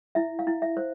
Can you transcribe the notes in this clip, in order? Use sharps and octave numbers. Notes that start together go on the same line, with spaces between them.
E4 E5
F5
E4
E5
C5